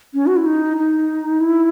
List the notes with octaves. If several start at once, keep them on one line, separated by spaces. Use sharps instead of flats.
C#4
F#4
E4
D#4
D#4
E4